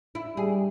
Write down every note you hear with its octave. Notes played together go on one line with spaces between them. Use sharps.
E4
G3 G#4